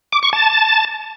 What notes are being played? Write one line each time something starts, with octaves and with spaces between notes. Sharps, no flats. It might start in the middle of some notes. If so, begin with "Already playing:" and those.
D6
C#6
A5